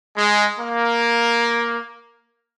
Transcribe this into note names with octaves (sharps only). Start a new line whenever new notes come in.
G#3
A#3